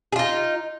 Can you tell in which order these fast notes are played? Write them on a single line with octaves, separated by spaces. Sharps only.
G#4 F4 D#4